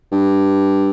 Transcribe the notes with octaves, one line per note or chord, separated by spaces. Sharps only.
G2